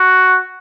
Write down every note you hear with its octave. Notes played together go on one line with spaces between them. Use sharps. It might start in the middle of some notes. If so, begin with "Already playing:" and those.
Already playing: F#4